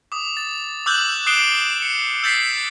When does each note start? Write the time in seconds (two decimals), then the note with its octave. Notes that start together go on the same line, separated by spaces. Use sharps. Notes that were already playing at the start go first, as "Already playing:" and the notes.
0.12 D6 D#6
0.37 A6
0.86 D6 E6 F#6 G6 F#7
1.26 D#6 F#6 C7 D7 E7 G7
1.82 C#7
2.23 E6 G6 A6 B6 C7